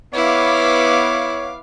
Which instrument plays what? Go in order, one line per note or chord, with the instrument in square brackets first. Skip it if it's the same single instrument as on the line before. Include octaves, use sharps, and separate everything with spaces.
[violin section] B3 F5 D6 [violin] E4 [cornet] C#5